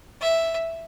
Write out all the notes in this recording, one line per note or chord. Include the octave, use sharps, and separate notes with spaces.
E5